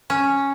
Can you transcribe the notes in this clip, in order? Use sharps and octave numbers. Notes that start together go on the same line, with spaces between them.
C#4